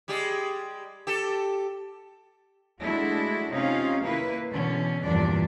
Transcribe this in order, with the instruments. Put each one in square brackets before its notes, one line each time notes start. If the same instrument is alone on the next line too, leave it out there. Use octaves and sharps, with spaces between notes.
[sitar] G3 G#3 G4
G4 A4
[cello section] G#3 A3 D4 E4 F#4
C3 C#4 D#4 F4 F5
D#3 A#3 E4 B4
B2 D3 E3 C#4
E2 G2 A#2 F3 D4 D5